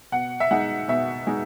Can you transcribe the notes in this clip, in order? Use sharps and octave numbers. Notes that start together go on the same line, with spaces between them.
B2 F#5
E5
G#3 D#4 F#5
B2 E5
G#3 D#4